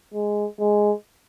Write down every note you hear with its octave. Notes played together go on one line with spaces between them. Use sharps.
G#3
G#3